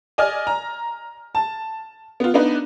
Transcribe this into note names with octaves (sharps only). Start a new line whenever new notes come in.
D5 D#5 G#5 F6
A#5
A5
B3 F4
B3 D4 D#4 B4